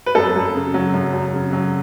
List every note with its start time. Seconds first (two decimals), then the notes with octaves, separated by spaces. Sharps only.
0.06 B4
0.15 F#2 A4
0.36 F#2
0.54 C#3
0.74 F#3
0.94 F#2
1.13 F#2
1.33 C#3
1.53 F#3